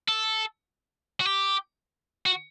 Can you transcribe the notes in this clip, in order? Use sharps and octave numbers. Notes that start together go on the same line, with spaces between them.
A4
F#4
G4
F#4